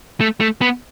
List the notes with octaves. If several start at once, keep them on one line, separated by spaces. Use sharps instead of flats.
A3
A3
B3